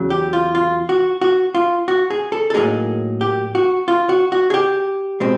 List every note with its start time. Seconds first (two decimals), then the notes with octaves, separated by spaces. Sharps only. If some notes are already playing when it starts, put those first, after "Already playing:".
Already playing: E2 C#3 F#3
0.10 G4
0.33 F4
0.55 F4
0.89 F#4
1.21 F#4
1.55 F4
1.88 F#4
2.10 G#4
2.32 A4
2.50 A4
2.54 A2 F#3 A#3 D#4 G#4
3.21 G4
3.55 F#4
3.88 F4
4.09 F#4
4.32 F#4
4.50 G#4
4.54 G4
5.20 B2 G#3 C4